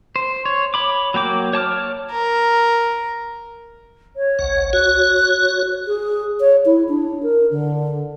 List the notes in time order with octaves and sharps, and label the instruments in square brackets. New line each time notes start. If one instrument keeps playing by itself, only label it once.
[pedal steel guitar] C5
C#5
C#5 B5 D6
F#3 A#3 G5 D6
C#5 A5 D6 F6
[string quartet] A#4
[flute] C#5
[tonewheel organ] G#1 C#2 F#5
[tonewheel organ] F#4 C#5 [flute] F#6
[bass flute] G#4
C#5
E4
D4
A#4
D3